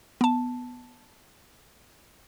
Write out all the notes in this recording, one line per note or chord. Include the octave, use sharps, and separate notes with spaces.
B3 A5